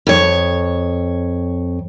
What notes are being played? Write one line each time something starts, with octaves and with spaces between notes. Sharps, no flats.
F2 C#5